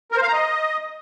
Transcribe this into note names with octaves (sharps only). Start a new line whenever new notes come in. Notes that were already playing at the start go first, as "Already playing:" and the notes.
A#4
C5
F5
A#5
D#5